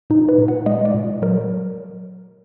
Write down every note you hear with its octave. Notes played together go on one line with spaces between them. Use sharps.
A#2 D#4
B4
A#2
F#5
G#3 D#5
D5
A#2
F#3 A#4